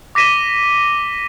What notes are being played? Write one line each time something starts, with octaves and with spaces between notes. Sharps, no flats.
D6 A#6 B6 D#7 E7 G7